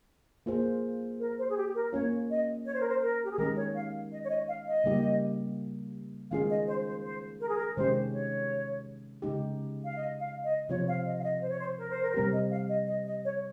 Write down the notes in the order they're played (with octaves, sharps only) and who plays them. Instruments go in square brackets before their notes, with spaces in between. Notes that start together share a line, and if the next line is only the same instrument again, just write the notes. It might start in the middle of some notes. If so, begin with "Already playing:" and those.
[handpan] A#3 F4 G#4 C5
[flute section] A#4
C5
G#4
G4
A#4
[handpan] A#3 C#4 F4 [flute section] C#5
[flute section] D#5
C#5
C5
A#4
C5
A#4
G4
G#4
[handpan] D#3 G#3 C#4 G4 [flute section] A#4
[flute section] C#5
F5
D#5
C#5
D#5
F5
D#5
[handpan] C#3 G3 A#3 D#4 G4
[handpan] D#3 G#3 C#4 F4 G#4 [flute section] F5
[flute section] D#5
C5
C5
C5
A#4
G#4
A#4
[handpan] C3 D#3 G#3 C#4 G4 [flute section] C5
[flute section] C#5
[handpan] C#3 G#3 D#4 G4
[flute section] F5
D#5
F5
D#5
[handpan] C3 F3 C4 F4 [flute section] C#5
[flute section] F5
D#5
F5
D#5
C5
C#5
C5
A#4
C5
A#4
C5
[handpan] C3 G3 C4 G4 [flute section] A#4
[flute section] D#5
F5
D#5
D#5
D#5
C#5